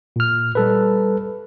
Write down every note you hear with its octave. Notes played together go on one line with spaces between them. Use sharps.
A#2 F6
G3 A4 B4